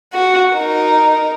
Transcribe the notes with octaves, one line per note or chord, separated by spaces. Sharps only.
F#4
D#4 A#4